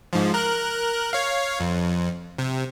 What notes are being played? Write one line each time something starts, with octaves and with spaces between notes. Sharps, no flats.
G#2 F3
A#4 F#6
C#5 F5
F2
C3